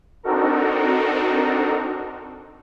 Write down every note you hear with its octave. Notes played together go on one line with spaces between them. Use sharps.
C4 D4 D#4 F#4 A4 A#4